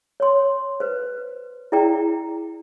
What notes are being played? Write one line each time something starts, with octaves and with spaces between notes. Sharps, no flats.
C#5 C6
B4 C5
E4 G#4 D5 G5 A#5